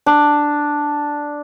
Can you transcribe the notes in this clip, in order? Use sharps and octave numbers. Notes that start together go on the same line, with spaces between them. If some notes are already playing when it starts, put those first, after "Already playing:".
D4